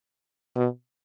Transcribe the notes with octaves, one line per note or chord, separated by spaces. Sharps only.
B2